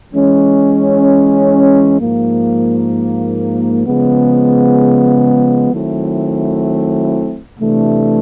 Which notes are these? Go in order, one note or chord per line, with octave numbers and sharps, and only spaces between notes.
E3 G#3 C#4
G#2 F3 A#3
C#3 F3 G#3 B3
D#3 F#3 A3 C4 E4
C3 E3 A3 D4